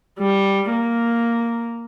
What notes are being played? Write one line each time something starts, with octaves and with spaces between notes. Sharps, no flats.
G3
A#3